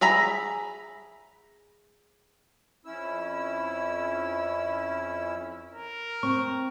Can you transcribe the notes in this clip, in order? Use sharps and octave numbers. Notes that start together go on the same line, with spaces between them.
G#4 E5 A#5 B5
F2 C#4 E4 E6
A#4
C4 C#6